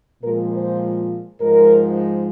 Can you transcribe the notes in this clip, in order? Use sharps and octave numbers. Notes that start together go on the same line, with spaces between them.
A#2 F3 G#3 A#4
C5
G#2 F3 G#3 A#4